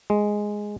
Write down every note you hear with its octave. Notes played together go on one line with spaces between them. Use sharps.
G#3